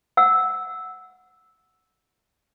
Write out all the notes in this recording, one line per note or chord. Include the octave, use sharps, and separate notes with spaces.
F#5 E6